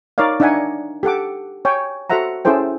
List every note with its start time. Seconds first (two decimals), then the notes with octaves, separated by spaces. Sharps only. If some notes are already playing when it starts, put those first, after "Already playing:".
0.18 D#4 A#4 C#5 D5 F5
0.40 D4 D#4 E5 F#5 G#5
1.03 G4 A4 F#5 D6
1.65 C#5 G5 G#5
2.10 F#4 A4 C5 E5 F#5 A#5
2.45 C#4 E4 G#4 A4 C5 G5